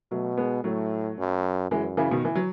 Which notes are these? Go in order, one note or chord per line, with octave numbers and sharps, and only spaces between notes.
B2 F#3 A3
G#3 B3
A2 F#3 A3
F#2
F#2 E3 G#3
C#3 E3
B2 D#3
E3
F#3